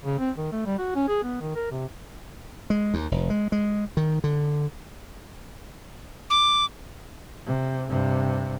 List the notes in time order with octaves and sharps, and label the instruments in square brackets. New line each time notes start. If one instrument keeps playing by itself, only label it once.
[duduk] C#3
C4
D#3
A3
G3
F#4
C#4
G#4
B3
D#3
A#4
C3
[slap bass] G#3
D#2
F1
G#3
G#3
D#3
D3
[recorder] D6
[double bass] C3
G2 C3